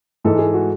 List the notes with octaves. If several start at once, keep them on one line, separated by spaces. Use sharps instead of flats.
G#2 E3 G#3 A4
G#4
F#4